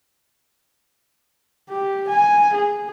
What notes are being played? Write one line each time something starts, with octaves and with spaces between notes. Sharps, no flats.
G4
G#5
G#4